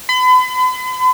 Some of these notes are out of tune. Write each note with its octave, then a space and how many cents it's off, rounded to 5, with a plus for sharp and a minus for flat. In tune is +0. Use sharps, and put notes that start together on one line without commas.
B5 +40